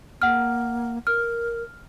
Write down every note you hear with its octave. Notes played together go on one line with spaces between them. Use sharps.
A#3 F#5 F6
A#4 F6